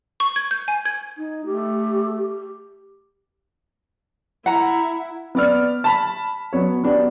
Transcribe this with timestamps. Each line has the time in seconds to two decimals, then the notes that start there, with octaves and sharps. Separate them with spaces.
0.20 C#6
0.36 G#6
0.51 G6
0.68 G#5
0.85 G#6
1.18 D#4
1.46 A3 G4
2.16 G4
4.46 E4 F#5 A#5
5.35 B3 D5 F6
5.84 A5 B5 B6
6.53 F#3 B3 C#5
6.83 B3 D4 F#4 G4